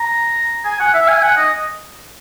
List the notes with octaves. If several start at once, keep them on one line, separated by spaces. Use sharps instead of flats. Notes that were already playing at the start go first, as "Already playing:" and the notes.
Already playing: A#5
G#5
F#5
E5
G#5
F#5
D#5